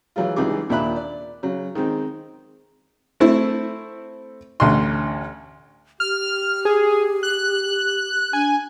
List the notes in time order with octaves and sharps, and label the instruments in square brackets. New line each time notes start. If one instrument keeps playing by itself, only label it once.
[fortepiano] E3 F#3 G#3 F4
C#2 E3 G3 D#4 G#4 D6
D#2 A#2 D4 E5 B5 F#6
D5
C#3 F#3
D#3 G#3 C4 D#4
A3 C4 E4
A1 D2 C6
[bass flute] G4 [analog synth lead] F6
[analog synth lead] G#4
F#6
[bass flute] D4 [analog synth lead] G#5